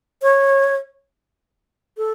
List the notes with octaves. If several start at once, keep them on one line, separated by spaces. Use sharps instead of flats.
C#5
A4